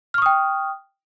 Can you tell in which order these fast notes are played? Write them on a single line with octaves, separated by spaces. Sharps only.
F6 C#6 D#6 G5